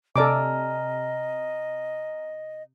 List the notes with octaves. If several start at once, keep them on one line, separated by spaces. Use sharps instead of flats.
C3 A4 D5 D#5 G#5 A#5 D6 F6